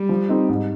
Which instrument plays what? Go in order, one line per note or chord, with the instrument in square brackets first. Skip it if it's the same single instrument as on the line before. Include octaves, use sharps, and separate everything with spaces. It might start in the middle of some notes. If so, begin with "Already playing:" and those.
Already playing: [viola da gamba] G3
[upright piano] F3
C4 D#4
G#2